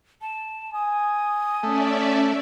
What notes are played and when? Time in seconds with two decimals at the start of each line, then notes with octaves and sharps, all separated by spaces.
0.22 A5
0.74 G#5 D#6
1.63 A3 C#4 D5 E5